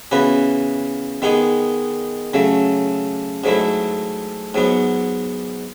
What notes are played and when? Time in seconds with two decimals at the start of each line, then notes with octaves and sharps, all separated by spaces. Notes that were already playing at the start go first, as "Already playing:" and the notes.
0.11 C#3 E3 B3 F#4 B4
1.22 D#3 G#3 B3 D#4 G#4
2.34 C#3 F#3 A3
3.44 G#2 F#3 A3 E4
4.54 G#2 F#3 B3